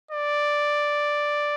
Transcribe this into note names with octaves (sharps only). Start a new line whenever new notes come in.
D5